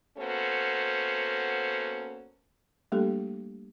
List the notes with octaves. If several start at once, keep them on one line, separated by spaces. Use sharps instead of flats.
A#3 B3 C#4 F#4 A4 C5
G3 A3 A#3 D4 G4 A4